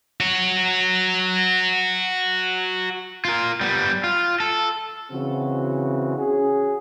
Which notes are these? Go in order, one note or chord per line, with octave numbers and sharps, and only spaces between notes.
F#4 C#5
F4 A#4
G3 B3
F4
A4
C#3 E3 C4 F#4
C#4 F#4 G#4